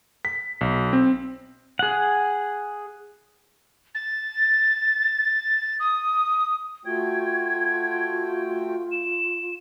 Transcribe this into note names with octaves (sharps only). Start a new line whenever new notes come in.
B6
B1
C4
G#4 F#5
A6
D#6
A3 F4 F#4 G5 G#6
E7